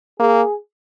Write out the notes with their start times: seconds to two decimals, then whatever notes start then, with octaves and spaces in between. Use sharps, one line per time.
0.20 A#3 G#4